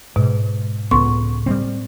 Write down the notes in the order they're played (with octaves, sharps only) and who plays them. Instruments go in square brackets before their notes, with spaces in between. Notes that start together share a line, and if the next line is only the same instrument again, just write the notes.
[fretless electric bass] G#2 [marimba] B2
[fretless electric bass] C#2 B3 [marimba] A2 C6 C#6
[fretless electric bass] G3 A3 C4